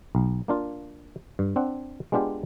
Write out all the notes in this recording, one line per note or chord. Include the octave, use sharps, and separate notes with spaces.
B1
A#3 D4 F4
G2
C4 D4 F#5
G#3 B3 D4 F4 G4